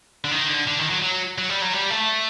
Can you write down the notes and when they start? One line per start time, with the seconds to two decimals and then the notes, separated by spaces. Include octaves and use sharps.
0.25 D3
0.31 D#3
0.49 D3
0.67 D3
0.79 D#3
0.90 F#3
1.02 F#3
1.38 F#3
1.49 G3
1.62 F#3
1.73 G3
1.90 A3